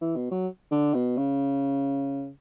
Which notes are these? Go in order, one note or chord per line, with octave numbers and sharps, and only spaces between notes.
E3
B2
F#3
D3
B2
C#3